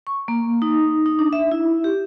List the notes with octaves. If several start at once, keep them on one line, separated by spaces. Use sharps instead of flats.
C#6
A#3
D#4
D#4
D4
E5
E4
G4